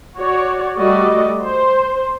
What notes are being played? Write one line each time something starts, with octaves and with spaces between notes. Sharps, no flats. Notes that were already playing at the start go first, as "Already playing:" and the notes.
F#4 C#5 D5
G3 A3 F#4 D5 D#5
C5